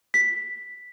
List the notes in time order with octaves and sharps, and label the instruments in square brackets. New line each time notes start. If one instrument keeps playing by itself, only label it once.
[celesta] B6